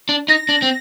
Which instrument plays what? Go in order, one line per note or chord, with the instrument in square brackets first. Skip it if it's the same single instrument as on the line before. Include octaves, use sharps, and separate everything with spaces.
[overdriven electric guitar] D4
[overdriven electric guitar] D#4 [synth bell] A#6
[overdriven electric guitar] D4
C4